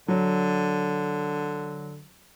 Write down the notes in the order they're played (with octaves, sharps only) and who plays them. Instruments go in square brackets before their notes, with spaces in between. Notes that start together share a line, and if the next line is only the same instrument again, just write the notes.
[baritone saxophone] D3 [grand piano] F#3